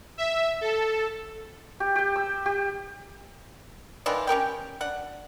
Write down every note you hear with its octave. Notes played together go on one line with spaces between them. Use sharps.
E5
A4
G4
G4 G5
E6
G4
D#3 E3 D4 F4
C#4 G4 A#4 G5
D4 F#5